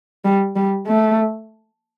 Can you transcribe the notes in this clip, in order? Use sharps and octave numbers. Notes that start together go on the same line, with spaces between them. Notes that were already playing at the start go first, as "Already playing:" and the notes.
G3
G3
A3